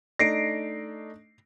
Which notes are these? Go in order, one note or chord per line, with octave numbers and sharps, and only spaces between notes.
A3 D4 D#4 A#6 C7 D7